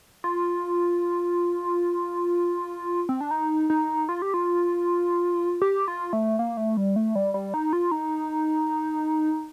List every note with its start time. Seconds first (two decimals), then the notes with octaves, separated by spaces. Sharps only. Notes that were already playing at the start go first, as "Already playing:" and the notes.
0.24 F4
3.09 C4
3.21 D4
3.31 D#4
3.70 D#4
4.09 F4
4.22 G4
4.34 F4
5.62 G4
5.88 F4
6.13 A3
6.39 A#3
6.57 A3
6.77 G3
6.96 A3
7.15 G3
7.34 G3
7.54 D#4
7.73 F4
7.91 D#4